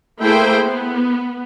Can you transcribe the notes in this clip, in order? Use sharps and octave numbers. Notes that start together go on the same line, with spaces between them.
A3 A#3 E4 G#4 C5 G5
B3